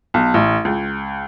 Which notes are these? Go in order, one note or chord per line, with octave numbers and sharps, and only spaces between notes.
B1
A1
C#2